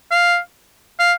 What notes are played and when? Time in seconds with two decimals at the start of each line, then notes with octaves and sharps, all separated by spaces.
0.11 F5
0.99 F5